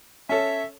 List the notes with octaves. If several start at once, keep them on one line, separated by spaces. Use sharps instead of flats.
C#4 A4 C#5 E5